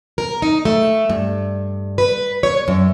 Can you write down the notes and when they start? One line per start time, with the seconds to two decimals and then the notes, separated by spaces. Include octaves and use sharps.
0.18 A#4
0.42 D#4
0.65 A3
1.10 G2
1.98 B4
2.43 C#5
2.68 F#2